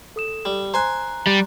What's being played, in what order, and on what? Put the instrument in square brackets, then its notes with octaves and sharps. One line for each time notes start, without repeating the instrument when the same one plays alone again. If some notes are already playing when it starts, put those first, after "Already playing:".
[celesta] A4 D#6 E7
[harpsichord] G3
[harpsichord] C5 G#5 [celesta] A#5 F#6
[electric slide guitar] G3